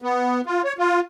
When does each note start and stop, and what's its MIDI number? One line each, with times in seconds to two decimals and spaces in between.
0.02 0.41 59
0.46 0.62 65
0.64 0.73 73
0.78 1.00 65